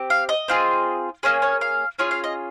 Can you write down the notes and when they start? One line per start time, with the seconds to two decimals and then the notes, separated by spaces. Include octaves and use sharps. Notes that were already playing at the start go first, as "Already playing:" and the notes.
Already playing: C4 G4
0.10 F5
0.29 D#5
0.48 C4 F4 G#4
1.23 A#3 C#4 G#4 C#5
1.42 C#5
1.61 F5
1.99 C#4 F4 G#4 C#5
2.11 F5
2.24 D#5